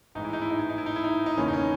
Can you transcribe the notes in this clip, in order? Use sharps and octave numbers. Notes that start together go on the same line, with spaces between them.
A1 G#2 E3 D#4
E4
D#4
E4
D#4
E4
D#4
E4
D#4
E4
D#4
D#4
F#1 E2 D#3 C#4
D#4
C#4